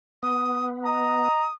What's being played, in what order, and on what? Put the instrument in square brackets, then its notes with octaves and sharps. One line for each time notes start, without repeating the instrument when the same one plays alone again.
[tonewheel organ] B3 [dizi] D#6
[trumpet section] D#5 A#5 [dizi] D#6